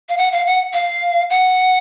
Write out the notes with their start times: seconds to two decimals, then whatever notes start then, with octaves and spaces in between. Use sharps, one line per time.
0.09 F5
0.18 F#5
0.32 F5
0.46 F#5
0.73 F5
1.30 F#5